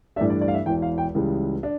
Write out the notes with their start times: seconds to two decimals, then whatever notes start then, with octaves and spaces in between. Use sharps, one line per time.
0.16 G2 E3 A3 D4 E5
0.30 D5
0.41 D5
0.48 F5
0.54 E5
0.66 E1 E2 E3 G5
0.82 F5
0.98 G5
1.15 C#2 C#3 E3 G3
1.63 D4